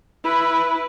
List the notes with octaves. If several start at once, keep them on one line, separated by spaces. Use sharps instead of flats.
E4 B4